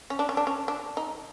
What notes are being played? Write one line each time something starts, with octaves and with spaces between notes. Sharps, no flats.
C#4
D4
C#4
D4
C#4
D4
D#4